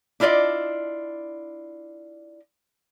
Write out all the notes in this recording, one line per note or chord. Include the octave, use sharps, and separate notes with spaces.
D4 E4 F4 D5 D#5